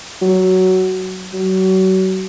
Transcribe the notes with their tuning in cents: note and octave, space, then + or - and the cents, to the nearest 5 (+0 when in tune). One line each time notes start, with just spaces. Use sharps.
F#3 +10
F#3 +30